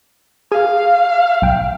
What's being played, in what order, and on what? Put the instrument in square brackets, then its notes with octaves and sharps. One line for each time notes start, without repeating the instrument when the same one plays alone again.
[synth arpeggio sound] G#4 G#6 D#7 [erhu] F5
[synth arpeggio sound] B1 G5